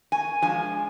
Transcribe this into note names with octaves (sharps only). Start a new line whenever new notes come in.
G#5
F3 G#3 D4 F4 G#5